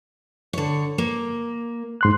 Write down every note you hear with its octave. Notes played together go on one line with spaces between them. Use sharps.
D3 C#5
A#3
G#2 C6 F#6